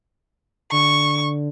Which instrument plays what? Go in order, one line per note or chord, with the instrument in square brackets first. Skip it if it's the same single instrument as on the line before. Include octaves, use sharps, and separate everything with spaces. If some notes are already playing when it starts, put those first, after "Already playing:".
[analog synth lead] D3 [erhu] C#6